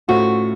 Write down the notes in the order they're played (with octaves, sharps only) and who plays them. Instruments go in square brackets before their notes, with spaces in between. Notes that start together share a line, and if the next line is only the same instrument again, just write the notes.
[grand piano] A2 A3 C#4 F4 C5 [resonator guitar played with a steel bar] F#4